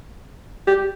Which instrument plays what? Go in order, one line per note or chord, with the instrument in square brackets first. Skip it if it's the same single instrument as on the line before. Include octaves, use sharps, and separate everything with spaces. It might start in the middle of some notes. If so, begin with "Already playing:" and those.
[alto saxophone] G4